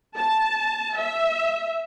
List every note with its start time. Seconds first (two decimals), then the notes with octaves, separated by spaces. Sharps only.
0.18 A5
0.97 E5